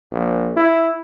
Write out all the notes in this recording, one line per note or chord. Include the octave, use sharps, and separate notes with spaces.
A#1
E4